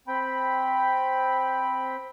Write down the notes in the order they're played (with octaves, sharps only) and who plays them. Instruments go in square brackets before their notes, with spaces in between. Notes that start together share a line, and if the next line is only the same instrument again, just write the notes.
[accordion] C4 G5 B5